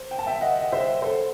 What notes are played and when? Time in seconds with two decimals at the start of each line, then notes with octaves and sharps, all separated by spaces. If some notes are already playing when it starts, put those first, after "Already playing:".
Already playing: C5
0.11 G5
0.19 A5
0.27 E5 G5
0.41 D#5 F#5
0.61 D#5
0.72 C5 E5
1.02 A4 C5